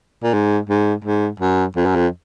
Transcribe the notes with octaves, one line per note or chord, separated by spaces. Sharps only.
A#2
G#2
G#2
G#2
F#2
F2
F#2
F2